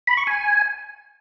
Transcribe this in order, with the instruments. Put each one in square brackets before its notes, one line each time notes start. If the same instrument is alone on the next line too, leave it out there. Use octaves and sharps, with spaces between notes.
[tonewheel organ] B5
C#6
G#5